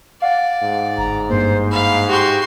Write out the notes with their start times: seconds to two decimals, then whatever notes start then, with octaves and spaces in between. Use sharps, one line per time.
0.22 D5 F5 F#5
0.62 G#2
0.98 G1 A#5
1.29 G2 A#3 C5
1.71 F5 B5
2.08 F#4 G4 C6